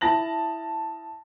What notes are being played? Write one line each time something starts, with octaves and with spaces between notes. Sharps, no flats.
E4 A5 A#6 F#7